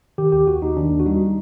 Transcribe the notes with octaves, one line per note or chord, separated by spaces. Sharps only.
D#3 G4
D#2 G4
D#2 F#4
D#2 D#4
D#3 D4
D#2
F#4
G3 D#4